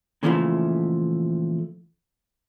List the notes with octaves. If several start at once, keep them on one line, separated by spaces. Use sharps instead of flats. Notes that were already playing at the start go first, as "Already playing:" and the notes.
A#2 C#3 E3 F3 G#3 A3